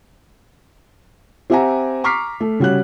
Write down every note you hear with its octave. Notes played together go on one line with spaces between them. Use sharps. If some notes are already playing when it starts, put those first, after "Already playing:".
C4 G4 E5 F#5 G#5 A#5
A#5 C#6 D6 F6 B6 C7
A3
C#3 G3 F#4 C#5 F#6